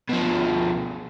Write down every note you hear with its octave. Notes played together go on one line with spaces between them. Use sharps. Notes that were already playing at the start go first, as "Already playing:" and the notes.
B2 F3